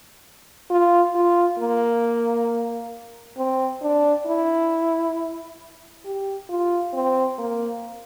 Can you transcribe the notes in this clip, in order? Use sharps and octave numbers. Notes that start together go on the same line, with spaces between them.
F4
F4
A#3
C4
D4
E4
G4
F4
C4
A#3